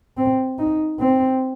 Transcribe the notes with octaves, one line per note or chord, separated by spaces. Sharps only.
C4
D#4
C4